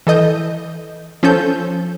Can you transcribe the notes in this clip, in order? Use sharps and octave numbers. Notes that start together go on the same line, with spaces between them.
E3 A4 D#5 G6
F3 C#4 A4 G6